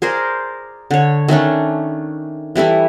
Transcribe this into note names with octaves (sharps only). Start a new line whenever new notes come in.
G#4 A#4 C5 D5
D3 C#5
D#3 A3 C#4 D4
E3 G3 A3 E4